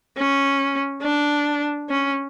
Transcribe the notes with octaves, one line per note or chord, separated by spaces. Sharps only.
C#4
D4
C#4